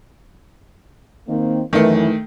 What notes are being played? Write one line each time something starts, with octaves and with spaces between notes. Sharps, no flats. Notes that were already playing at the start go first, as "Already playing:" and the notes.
D#3 A#3 C4
F#2 D#3 E3 A3 E4